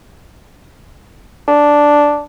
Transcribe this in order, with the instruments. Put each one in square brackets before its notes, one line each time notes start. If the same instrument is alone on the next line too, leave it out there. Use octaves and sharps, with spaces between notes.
[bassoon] D4